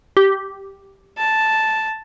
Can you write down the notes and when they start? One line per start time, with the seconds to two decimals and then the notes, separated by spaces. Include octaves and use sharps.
0.17 G4
1.18 A5